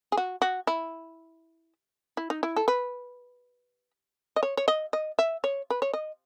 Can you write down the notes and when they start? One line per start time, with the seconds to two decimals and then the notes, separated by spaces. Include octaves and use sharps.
0.12 G#4
0.17 F#4
0.42 F#4
0.67 E4
2.17 E4
2.30 D#4
2.43 E4
2.56 A4
2.68 B4
4.36 D#5
4.43 C#5
4.57 C#5
4.68 D#5
4.93 D#5
5.19 E5
5.44 C#5
5.70 B4
5.82 C#5
5.93 D#5